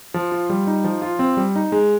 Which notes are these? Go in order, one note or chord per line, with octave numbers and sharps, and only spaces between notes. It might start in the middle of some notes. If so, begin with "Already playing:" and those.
F3
F4
G3
D#4
F3
F4
C4
G3
D#4
G#3